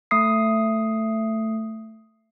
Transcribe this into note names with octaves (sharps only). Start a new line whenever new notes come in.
A3 D#6 C7